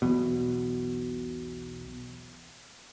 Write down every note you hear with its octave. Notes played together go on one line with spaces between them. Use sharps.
B1 E2 B2